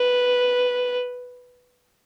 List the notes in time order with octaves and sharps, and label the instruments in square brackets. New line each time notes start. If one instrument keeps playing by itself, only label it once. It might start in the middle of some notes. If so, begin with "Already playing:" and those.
Already playing: [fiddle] B4